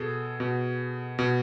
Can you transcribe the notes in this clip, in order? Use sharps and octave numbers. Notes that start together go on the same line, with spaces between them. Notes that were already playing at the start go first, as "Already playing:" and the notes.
Already playing: B2 G#4 A4
B2
B2